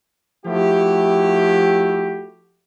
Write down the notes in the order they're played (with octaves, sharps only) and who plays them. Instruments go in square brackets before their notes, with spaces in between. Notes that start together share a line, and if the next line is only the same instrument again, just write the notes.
[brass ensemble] F3 A3 E4 F#4 G4